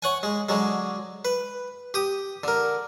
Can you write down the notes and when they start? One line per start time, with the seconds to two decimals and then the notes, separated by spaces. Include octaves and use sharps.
0.03 C#5 F#5 G#5
0.23 G#3
0.49 D3 F#3 G#3
1.25 B4
1.94 G4 D#6
2.44 D3 A#4